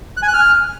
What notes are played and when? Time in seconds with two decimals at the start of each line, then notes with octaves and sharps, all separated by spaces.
0.17 F#6
0.23 G#5
0.28 F#6
0.34 F6